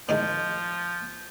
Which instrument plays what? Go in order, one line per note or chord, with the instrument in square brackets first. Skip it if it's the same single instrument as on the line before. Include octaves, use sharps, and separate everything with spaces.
[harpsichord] A2 D#3 G#3 [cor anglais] F3